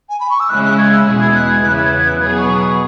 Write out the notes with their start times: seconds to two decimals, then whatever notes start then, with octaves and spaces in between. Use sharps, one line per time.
0.10 G#5
0.20 B5
0.30 C#6
0.40 E6
0.49 C#3 G#3 C#4 E4 F#6
0.64 F#6
0.78 G#6
0.92 E6
1.06 E2 B2 G#3 E4 G#4
1.21 G#6
1.35 F#6
1.50 G#6
1.63 E2 C#3 E3 B3 E4 F#6
1.78 G#6
1.92 G#6
2.06 F#6
2.20 B2 F#3 B3 G#4 G#6
2.38 C#6